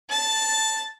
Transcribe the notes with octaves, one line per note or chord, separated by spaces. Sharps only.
A5 A6